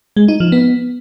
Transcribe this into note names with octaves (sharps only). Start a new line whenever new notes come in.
G#3
D#4
F3
B3